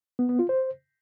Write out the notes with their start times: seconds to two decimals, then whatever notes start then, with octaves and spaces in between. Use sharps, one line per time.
0.19 B3
0.29 B3
0.39 F4
0.49 C5